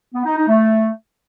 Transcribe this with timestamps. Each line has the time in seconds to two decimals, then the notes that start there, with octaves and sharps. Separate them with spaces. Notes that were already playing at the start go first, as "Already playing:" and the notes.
0.15 B3
0.26 D#4
0.37 D#4
0.48 A3